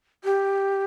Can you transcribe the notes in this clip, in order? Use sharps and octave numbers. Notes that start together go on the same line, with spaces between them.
G4